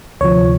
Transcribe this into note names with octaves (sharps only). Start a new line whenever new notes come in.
D2 C3 F3 C#5